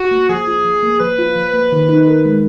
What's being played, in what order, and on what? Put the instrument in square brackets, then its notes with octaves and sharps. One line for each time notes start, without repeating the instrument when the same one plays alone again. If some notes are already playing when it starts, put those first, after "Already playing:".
Already playing: [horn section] F#4
[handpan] A#3
[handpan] F3 [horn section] G#4
[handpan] F4
F3
A#3
[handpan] F3 [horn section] B4
[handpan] F4
F3
A#3
D#3
D#4
A#4
G#3